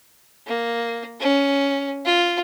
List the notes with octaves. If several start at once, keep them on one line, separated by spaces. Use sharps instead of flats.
A#3
C#4
F4